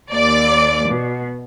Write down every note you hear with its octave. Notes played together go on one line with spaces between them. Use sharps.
D#2 D5 D6
B2